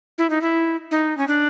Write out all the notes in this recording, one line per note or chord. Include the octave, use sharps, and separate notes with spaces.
E4
D#4
E4
D#4
C#4
D4